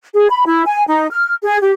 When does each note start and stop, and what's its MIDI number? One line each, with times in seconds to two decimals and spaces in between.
0.15 0.28 68
0.30 0.45 83
0.46 0.63 64
0.66 0.84 80
0.88 1.07 63
1.12 1.34 89
1.44 1.58 68
1.61 1.73 67